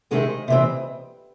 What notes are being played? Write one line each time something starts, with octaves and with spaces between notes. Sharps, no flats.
C3 D#3 G#3 C4 D#5
C3 E3 C4